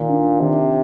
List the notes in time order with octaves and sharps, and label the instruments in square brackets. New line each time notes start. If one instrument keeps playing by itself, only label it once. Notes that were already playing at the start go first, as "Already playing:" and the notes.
Already playing: [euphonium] A#2 [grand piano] D#3
[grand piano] D4
[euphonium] C3 [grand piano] D#3